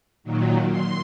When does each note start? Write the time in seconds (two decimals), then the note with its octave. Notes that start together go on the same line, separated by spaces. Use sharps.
0.24 A#2 D#3 F#3
0.69 C6